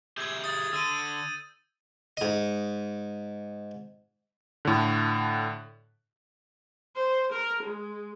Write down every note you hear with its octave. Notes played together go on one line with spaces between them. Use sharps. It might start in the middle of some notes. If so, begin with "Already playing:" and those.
G4 G#4 E5 G6 G#6
D#6 A6
D3 E6 D#7
G#2 D#5
A2 D3
C5
A#4
G#3